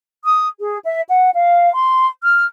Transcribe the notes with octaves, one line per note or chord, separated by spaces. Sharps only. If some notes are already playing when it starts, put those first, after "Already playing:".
D#6
G#4
E5
F#5
F5
C6
F6